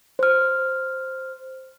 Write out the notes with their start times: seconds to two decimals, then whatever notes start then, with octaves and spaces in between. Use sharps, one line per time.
0.19 C5 F6